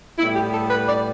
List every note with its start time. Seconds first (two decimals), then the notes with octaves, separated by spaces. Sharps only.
0.19 A2 G3 B3 E4
0.36 G4
0.53 A4
0.71 B4
0.87 D5